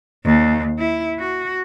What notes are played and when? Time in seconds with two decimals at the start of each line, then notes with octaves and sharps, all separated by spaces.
0.24 D#2
0.78 E4
1.19 F#4